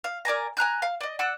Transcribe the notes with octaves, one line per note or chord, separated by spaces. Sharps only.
F5
A#4 D5 G#5 A#5
G#5 A#5 F#6 G6
F5
D5 D#5
D5 F#5 E6 F#6